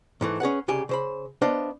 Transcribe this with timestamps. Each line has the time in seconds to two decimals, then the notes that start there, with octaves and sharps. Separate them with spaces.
0.21 G#2 E3 A3
0.40 C#4 G#4 B4 F#5
0.68 C2 C#3 G4 G#5
0.89 C#3 C5 B5
1.42 B3 D4 C5 D#5 F5